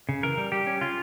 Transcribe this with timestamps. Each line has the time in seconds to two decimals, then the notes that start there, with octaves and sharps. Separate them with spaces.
0.09 C#3
0.23 E3 A#4
0.37 G3
0.52 G3 G4
0.67 C#4
0.81 C#3 F4